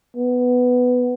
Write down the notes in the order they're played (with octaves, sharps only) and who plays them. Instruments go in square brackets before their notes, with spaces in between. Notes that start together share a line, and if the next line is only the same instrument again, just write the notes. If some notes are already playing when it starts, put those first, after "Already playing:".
[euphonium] B3